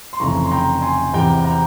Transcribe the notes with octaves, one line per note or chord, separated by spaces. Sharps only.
C6
F1 F2 C#3 E3 A#5 C#6
C6
G5 A#5
G#5 C6
E2 C3 E3 G5 A#5
G5 A#5